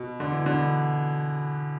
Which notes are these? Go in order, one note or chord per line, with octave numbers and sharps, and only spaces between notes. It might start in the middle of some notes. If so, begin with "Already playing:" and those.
Already playing: B2
D3
E3
B2 D3